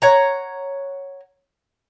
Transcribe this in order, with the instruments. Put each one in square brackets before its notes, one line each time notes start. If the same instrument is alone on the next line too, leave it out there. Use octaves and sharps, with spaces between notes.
[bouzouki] C#5 F#5 A#5